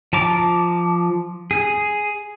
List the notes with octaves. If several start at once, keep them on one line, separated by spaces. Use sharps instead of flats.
F3 A5 A#5 D6
G#4